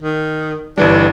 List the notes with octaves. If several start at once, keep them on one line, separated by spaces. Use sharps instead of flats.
D#3
G1 E3 G3 D4